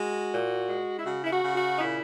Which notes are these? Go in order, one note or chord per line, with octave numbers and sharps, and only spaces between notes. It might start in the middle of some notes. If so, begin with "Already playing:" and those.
Already playing: G#3 F#4
A#2
G#3
E4
C#3 F#4
E4
F#4
C#3
F#4
D#4
A#2 E4